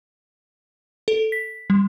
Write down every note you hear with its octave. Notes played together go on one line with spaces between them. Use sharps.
A4
B6
G3